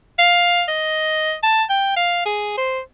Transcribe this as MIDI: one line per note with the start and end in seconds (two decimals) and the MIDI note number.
0.19 0.63 77
0.68 1.34 75
1.43 1.63 81
1.70 1.93 79
1.96 2.21 77
2.26 2.53 68
2.57 2.80 72